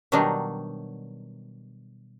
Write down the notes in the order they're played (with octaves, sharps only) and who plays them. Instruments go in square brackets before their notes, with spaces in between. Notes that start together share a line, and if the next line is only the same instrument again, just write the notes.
[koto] B2 D#3 F#3 G3 D4 D#4